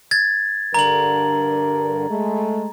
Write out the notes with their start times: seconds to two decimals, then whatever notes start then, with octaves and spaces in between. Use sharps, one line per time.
0.11 G#6 A6
0.74 G2 D3 A#4 A#5 F#7
2.10 G#3 A3